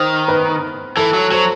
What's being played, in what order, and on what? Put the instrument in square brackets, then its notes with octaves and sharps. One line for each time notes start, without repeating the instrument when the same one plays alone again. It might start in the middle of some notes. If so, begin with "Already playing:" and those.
Already playing: [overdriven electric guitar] D#3 [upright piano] C5
[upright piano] B4
[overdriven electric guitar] E3 [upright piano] A4
[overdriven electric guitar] F#3
[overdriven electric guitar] F#3 [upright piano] C5